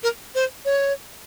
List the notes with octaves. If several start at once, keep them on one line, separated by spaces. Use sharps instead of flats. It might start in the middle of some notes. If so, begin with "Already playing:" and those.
A#4
C5
C#5